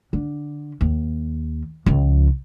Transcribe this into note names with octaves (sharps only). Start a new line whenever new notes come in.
D3
D#2
C#2 F3